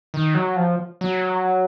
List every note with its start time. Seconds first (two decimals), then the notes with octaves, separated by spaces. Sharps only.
0.14 D#3
0.34 F#3
0.56 F3
1.01 F#3